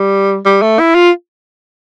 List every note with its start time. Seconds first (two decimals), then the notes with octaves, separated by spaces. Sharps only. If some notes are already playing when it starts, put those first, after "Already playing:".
Already playing: G3
0.45 G3
0.62 A3
0.79 E4
0.95 F4